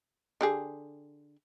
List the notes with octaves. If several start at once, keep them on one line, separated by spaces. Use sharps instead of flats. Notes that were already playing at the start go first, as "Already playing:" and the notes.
D3 G4 G#4